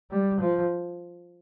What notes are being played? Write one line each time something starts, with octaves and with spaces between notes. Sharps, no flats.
G3
F3